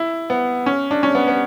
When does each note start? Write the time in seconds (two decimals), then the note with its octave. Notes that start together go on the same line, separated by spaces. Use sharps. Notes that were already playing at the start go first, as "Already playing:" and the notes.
Already playing: E4
0.30 B3
0.66 C#4
0.91 D4
1.03 C#4
1.15 B3
1.28 B3